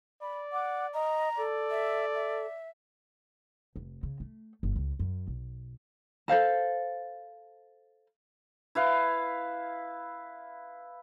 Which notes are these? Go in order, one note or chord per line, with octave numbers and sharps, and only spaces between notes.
D5 B5
F#5 D6
D#5 A#5
A4 D5
E5
E5
F1
C#3
A3
G1
C#2
F#2
B1
A4 C5 F5 A5
E4 B4 F5